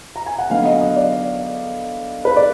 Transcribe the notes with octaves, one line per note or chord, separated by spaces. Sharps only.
A#5
G#5
F#5
D3 F#3 B3 D#4 F5
D#5
D#5
D5
B4
D5